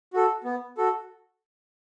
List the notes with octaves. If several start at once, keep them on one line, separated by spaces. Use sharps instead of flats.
F#4 A4
B3
F#4 A4